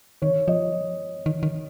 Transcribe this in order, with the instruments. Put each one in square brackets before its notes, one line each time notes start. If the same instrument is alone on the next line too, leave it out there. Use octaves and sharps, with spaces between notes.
[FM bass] D#3 [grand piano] C#5
[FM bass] F3 [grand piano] D#5
[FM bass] D#3
D#3